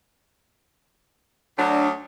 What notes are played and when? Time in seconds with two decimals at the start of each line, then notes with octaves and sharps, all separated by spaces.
1.59 D2 F#3 D4